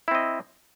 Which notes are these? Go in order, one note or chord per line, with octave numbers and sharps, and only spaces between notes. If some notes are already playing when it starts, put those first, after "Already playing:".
C4 E4 D#5